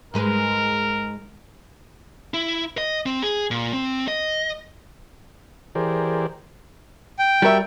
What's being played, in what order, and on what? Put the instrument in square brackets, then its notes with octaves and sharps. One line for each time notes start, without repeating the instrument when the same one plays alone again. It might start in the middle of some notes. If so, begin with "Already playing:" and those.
[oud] G#2 G#3 B4 [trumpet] A#4
[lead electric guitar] E4
D#5
C4
G#4
A#2
C4
D#5
[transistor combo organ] E3 G4 G#4 A#4 C5 D5
[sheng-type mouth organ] G5
[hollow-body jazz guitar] G3 A#4 [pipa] F#4 E5